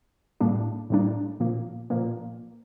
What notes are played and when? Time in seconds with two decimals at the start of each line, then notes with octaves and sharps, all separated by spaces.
0.40 A2 G3 A#3 D4
0.90 A2 G3 A#3 D4
1.40 A#2 F3 A#3
1.90 A#2 F3 A#3